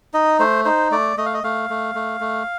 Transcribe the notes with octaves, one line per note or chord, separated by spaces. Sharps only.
D#4 D#5
A3 C5
D#4 C5
A3 D5
A3 D#5
F5
D#5
A3 F5
A3
A3
A3